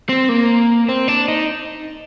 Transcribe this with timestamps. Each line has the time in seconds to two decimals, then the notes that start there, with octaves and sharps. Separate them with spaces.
0.09 C4
0.29 A#3
0.89 C4
1.08 D4
1.28 D#4